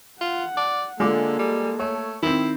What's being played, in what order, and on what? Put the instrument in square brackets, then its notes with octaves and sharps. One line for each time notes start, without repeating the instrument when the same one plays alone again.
[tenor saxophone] F4 [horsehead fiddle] F#5
[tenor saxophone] D5
[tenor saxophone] D3 [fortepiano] G#3 F4 D6 [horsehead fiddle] A#3 A4
[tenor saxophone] G3
[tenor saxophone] A3 [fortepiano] C#5
[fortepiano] D#3 C4 [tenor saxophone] E4